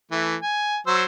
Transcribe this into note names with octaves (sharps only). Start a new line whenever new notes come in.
E3 A3
G#5
F#3 C5 E6